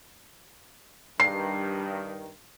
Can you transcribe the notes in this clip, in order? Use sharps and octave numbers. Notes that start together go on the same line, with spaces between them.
G2 D#3 C7